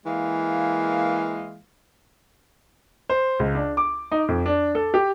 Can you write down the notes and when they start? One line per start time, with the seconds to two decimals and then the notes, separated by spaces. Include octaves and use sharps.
0.06 E3 G#3 A#3 F5
3.09 C5
3.39 C#2
3.55 D4
3.77 D6
4.12 D#4
4.28 F2
4.46 D4
4.75 A4
4.94 G4